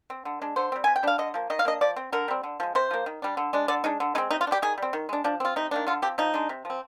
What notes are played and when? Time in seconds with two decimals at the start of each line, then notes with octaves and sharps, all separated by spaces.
0.10 C4
0.25 D3
0.42 G#3 D4
0.56 D3 C5
0.72 G3 C4
0.84 C3 G#5
0.96 G5
1.03 G3 D4 F5
1.18 D3 D#5
1.34 F3 A#3
1.50 D#3 D#5
1.59 F5
1.65 A#3 D4 D#5
1.81 F3 D5
1.96 C4
2.12 D3 A#4
2.28 G3 C4
2.43 D3
2.60 F3 G#3
2.75 C3 C5
2.91 F3 A#3
3.06 D#3
3.22 G3 D4
3.37 D3
3.53 G#3 D4
3.68 D3 D5
3.84 G#3 D4 D#4
4.00 D3
4.15 G#3 D#4
4.18 C4
4.30 C3 D#4
4.41 F4
4.47 D4
4.51 G3 G4
4.62 D#3 G#4
4.78 G3 C4
4.93 D#3
5.09 G#3 D4
5.24 F3 D4
5.40 C4 F4
5.56 C3 D#4
5.71 D#3 A#3 D4
5.87 D3 F4
6.02 F3 C4 G4
6.18 F3 D#4
6.34 G#3 D4
6.49 C3
6.65 F3 C4